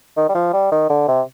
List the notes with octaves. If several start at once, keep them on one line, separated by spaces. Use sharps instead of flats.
D#3
G3
F3
G3
D#3
D3
C3